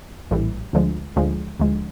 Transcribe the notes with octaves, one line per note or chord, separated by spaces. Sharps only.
A#1 A2 E3 G3
D2 D3 F3 G#3
D2 D3 F3 G#3
D2 D3 F3 G#3